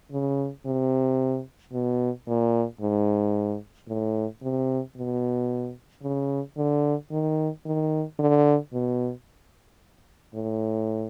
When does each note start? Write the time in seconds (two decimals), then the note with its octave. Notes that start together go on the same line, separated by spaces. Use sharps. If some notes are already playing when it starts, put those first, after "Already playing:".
0.12 C#3
0.65 C3
1.73 B2
2.27 A#2
2.81 G#2
3.88 A2
4.42 C3
4.96 B2
6.03 C#3
6.57 D3
7.11 D#3
7.66 D#3
8.19 D3
8.73 B2
10.34 A2